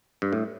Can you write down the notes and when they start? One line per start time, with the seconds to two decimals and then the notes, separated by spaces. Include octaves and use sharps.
0.22 G2
0.33 A2